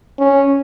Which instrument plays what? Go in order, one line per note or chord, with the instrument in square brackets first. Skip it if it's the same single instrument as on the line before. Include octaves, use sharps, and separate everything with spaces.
[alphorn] C#4